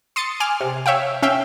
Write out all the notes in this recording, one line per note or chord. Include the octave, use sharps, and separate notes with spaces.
C6 D#6 A6 C#7
G#5 D6 F6
C3
C#5 E5 F5 G5
C#4 E5 F5 G5